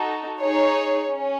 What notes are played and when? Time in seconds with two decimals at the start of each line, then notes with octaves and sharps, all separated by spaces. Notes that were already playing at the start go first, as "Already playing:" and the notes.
Already playing: D#4 F#4 A4
0.41 D#4 G#4 C#5
1.09 C#4